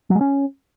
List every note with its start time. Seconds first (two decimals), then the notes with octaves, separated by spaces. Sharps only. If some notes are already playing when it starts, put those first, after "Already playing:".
0.10 F#3
0.15 G#3
0.21 C#4